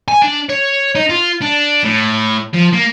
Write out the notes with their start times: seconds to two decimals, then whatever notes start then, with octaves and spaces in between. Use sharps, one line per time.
0.08 G#5
0.22 D4
0.49 C#5
0.95 D#4
1.10 F4
1.42 D4
1.84 A2
2.53 F3
2.73 A#3